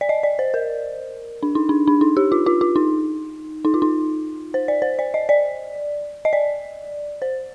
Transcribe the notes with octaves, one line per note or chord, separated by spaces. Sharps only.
D5
D#5
D5
C5
A#4
D4
D#4
D4
D4
D#4
G4
F4
F4
F4
D#4
D#4
F4
D#4
C5
D5
C5
D5
D#5
D5
D#5
D5
C5